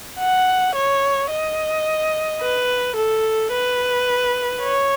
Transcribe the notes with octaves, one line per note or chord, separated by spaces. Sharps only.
F#5
C#5
D#5
B4
A4
B4
C#5